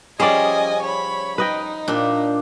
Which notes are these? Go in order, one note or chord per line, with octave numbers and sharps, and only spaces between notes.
F3 G3 C#4 G#4 D5 D#5 G#5
C#5 B5
D#4 B4 D#5 G5
A#2 D4 G4